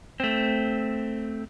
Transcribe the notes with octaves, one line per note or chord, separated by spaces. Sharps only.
A3 C4